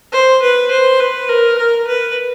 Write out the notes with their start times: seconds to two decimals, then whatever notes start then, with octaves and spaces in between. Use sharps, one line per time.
0.13 C5
0.43 B4
0.71 C5
1.00 B4
1.29 A#4
1.58 A#4
1.87 B4